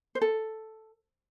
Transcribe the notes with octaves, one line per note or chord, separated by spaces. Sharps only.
C5
A4